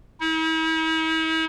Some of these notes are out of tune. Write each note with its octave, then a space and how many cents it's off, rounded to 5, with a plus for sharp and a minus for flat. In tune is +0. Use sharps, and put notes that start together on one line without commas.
E4 -45